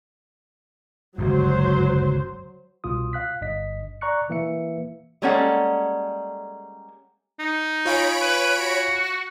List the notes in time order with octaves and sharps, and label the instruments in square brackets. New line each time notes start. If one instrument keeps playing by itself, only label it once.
[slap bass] G1 C#2 F#2 [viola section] F#3 C5
[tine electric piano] C2 B2 F4 D#6
F5 F#6 B6
G1 G2 D#5 B6
D5 A#5 C#6 F#6 C#7
E3 A#3 E5 C#7
[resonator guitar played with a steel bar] G3 G#3 A#3 C#4 A4 F#5
[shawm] D#4
[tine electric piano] F4 F5 G#5 [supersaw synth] C#5 B5 D7
[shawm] B4
F#4